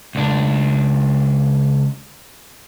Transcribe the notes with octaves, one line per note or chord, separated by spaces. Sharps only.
C#2 D4